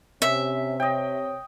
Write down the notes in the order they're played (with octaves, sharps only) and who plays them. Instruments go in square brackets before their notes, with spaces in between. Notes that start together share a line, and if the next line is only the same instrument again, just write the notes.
[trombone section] C3 [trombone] C#4 [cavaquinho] E5
[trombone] C#5 [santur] D#5 G5